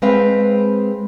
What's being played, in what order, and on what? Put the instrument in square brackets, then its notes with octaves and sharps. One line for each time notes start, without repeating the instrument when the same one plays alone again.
[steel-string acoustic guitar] G#3 C4 B4 F5 G5